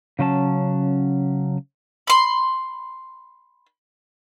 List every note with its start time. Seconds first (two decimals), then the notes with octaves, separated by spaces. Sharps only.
0.19 C#3 F#3 C#4 A5
2.07 B5 C6